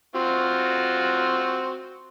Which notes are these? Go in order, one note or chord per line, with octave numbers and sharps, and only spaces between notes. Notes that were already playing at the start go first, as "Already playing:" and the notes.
C4 F4 F#4